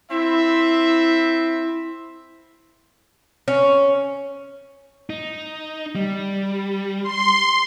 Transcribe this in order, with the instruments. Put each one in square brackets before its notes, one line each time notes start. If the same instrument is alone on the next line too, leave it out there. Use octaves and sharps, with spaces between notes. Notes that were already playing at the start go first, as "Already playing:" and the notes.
[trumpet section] C4 E5 [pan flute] E4
[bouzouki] C#4
[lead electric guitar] D#4
G3
[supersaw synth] C6